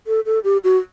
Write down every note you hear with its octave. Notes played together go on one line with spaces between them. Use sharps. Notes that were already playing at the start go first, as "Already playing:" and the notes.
A4
A4
G4
F#4